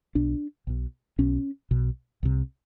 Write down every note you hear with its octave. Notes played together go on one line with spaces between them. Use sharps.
B1 B2 D4
B1 B2
B1 B2 C#4
B1 B2
C2 C3